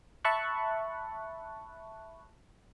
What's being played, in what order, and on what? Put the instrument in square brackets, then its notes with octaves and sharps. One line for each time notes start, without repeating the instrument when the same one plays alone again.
[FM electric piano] E5 A5 B5 C#6 F#6